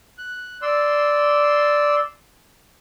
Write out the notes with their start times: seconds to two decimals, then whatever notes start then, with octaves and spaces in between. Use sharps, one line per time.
0.18 F#6
0.62 D5 C6 E6